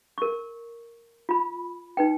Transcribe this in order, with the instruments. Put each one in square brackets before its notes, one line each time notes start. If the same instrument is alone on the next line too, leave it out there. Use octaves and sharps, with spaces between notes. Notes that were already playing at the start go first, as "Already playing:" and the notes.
[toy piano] A#4 C#6
F4 B5
D#4 B4 G5